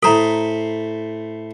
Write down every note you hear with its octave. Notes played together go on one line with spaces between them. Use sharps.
A2 A4 C5 A#5 B5